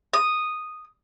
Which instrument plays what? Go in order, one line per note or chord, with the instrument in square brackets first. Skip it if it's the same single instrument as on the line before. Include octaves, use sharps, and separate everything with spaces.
[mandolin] D#6